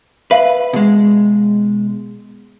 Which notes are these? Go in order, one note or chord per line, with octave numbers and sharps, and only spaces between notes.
B4 E5 F5
B2 G#3